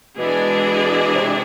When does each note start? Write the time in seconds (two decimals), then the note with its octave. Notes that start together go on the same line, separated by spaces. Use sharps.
0.18 B2 E3 G#3 D4 G#4 D5
1.15 C3